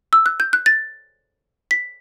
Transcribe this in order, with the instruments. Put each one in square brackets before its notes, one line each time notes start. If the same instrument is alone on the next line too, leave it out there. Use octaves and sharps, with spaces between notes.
[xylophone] E6
F#6
G6
F#6
A6
B6